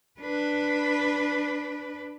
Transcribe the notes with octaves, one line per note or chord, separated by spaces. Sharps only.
D4 B4